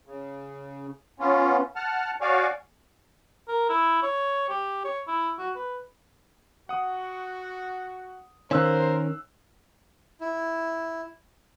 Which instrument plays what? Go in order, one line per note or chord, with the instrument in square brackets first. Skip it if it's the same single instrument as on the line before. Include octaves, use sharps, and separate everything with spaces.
[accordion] C#3
B3 C#4 F4
F#5 A5 F6
F#4 C#5 D5 F5 G#5
[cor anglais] A#4
E4
C#5
G4
C#5
E4
F#4
B4
[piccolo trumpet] F#4 [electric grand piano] F#5 D#6
[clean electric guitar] D#3 C#4 [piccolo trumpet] A#4 [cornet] C5 [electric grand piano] F5 E6 F#6
[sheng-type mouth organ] E4